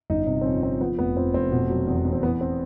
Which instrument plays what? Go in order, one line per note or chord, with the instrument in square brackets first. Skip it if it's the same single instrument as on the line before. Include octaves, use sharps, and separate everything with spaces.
[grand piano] G1 D#4
C3
C4
F2 C#4
F2 C4
F3 B3
F1 B3
F3 C4
F1 C4
B2
F#3
E2
E2
C4
E3 B3
C4